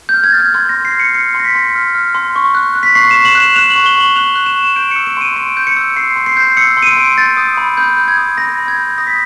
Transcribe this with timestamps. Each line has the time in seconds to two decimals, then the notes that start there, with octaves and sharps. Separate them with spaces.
0.09 F6 G6
0.24 G#6
0.32 F6 A6
0.39 G#6
0.54 C6 G#6
0.69 A#6
0.75 C6
0.85 C7
0.95 F6 C#7
1.14 F6 C#7
1.34 C6
1.40 A#6
1.44 B6
1.55 C6
1.75 F6
1.95 F6
2.15 C6
2.36 C#6
2.55 F#6
2.75 F#6
2.83 B6
2.95 C#6 C7
3.11 C#6 E7
3.25 F#7
3.35 F#6
3.40 E7
3.56 F#6 F7
3.70 F#7
3.76 C#6
3.86 G7
3.96 C#6 F#7
4.16 F#6 F7
4.36 F#6
4.46 E7
4.56 C#6
4.76 G6 D7
4.91 E6 C#7
5.07 D7
5.17 C6 D#7
5.36 C6 D7
5.57 G6
5.67 C#7
5.77 E6
5.96 C6 C7
6.16 C6
6.26 C7
6.37 G6
6.57 E6 C#7
6.77 C6
6.82 D#7
6.87 D7
6.97 C6
7.17 G6 A6
7.37 D#6
7.57 B5
7.77 B5 G6
7.97 G6
8.08 G#6
8.17 D#6
8.38 B5 A#6
8.58 B5
8.68 G#6
8.77 G6
8.98 D#6 A#6
9.07 B6